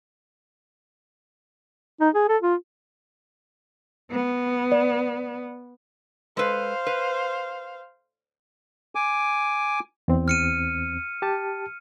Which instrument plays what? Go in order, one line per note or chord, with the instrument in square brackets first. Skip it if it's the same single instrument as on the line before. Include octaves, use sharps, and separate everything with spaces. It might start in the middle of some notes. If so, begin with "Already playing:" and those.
[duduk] D#4
G#4
A4
F4
[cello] B3
[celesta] D5
[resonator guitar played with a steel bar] G#3 A4 B4 [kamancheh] C5 F5
[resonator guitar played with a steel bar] B4
[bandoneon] G#5 D6
[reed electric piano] E2 C4
[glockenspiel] F6 C#7 D#7
[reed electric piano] G4 A5